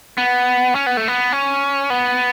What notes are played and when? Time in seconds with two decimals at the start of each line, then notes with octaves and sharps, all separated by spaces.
0.18 B3
0.75 C#4
0.86 B3
0.97 A3
1.08 B3
1.32 C#4
1.90 B3